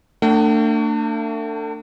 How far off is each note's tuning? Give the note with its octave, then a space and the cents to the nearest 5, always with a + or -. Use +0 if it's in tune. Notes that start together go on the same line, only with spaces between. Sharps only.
A3 +40 D4 +10 F#5 +45